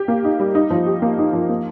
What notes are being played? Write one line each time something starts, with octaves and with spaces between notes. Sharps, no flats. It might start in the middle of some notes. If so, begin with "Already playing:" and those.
Already playing: G4
A#3
D#4
G3
D#4
F3
G4
A#3
D#4
F3
A#3